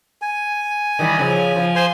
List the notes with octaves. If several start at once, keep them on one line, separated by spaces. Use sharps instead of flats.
G#5
D#3 E3 G3
C#3 F3
F3
C5 G#5 C6